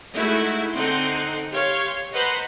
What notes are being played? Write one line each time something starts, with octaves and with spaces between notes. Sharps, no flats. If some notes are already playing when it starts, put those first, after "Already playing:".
G#3 A3 D#4 E4 F#4
D3 C4 D#4 F#5 C6
G4 C#5 F5 C6
B4 C5 D#5 F#5 A#5 B5